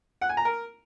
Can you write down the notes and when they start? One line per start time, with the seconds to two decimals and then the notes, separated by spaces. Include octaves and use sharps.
0.21 F#5
0.29 G#5
0.37 A#5
0.45 A#4